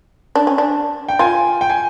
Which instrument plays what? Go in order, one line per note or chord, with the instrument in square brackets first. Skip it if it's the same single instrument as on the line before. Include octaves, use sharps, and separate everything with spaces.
[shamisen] D4
C#4
D4
[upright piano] G5
[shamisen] F4 [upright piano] G#5
[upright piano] G5
G#5